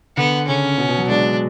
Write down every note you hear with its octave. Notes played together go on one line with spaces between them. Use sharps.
D3 B3
C#3 C#4
B2
B2
F#3
G#3 D4